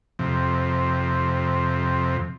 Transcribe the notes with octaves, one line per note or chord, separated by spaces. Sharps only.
F2 C3